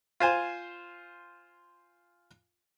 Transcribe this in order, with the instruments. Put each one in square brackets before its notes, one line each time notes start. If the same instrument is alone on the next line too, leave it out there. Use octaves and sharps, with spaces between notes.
[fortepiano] F4 C5 G#5